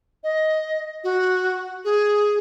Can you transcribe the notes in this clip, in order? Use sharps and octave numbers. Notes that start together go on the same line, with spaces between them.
D#5
F#4
G#4